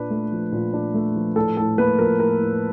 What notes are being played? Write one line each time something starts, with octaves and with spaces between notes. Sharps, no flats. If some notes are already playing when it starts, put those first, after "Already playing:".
Already playing: A#2 D4 B4
A3
F3
A#2
D4
A3
F3
A2 A4
A2 A4
A#3 B4
F3 A#4
A2 A#4
A2